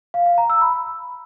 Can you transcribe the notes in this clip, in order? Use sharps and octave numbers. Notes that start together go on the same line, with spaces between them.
F5
F5
A#5
E6
B5